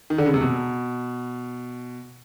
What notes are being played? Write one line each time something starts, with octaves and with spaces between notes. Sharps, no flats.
D#3
D3
C#3
C3
B2